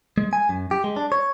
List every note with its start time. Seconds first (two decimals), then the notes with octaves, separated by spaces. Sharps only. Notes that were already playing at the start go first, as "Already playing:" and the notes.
0.18 G#3
0.33 G#5
0.49 F#2
0.71 G4
0.84 G#3
0.96 D4
1.12 C#5